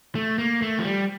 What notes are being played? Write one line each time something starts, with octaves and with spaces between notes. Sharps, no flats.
A3
A#3
A3
F3
G3